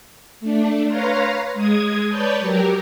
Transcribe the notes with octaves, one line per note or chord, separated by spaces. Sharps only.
A3 D4
B4 C#5 F5 A#5 C6
G#3 D#6 G#6
B4 C#5 D5 A5 G6
F#3 G4 A#4